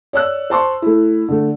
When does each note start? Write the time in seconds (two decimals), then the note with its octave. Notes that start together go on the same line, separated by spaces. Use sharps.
0.13 C#5 D5 E6 F#6
0.50 C5 A5 C6 C#6
0.82 A3 E4
1.28 D3 A3